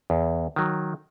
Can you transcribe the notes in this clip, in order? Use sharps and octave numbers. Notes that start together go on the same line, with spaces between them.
E2
D#3 F#3